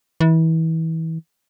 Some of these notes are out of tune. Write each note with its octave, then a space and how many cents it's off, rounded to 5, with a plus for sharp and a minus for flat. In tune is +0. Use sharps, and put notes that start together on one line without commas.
E3 -30